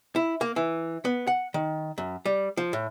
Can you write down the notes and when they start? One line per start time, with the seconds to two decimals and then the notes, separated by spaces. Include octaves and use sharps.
0.16 E4
0.41 A#3
0.56 E3
1.05 B3
1.27 F#5
1.54 D#3
1.98 F#2
2.25 G3
2.57 F3
2.73 A2